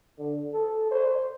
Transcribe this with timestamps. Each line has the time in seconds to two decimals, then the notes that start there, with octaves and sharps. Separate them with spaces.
0.19 D3
0.54 A4
0.91 C5